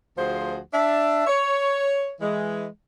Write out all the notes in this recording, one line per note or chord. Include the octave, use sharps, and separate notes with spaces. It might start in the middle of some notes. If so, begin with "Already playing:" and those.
D2 F3 F#4 G#4 C5
D4 E5
C#5
E3 G#3